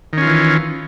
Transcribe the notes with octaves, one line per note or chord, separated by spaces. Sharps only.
D#3 E3 C#4 F4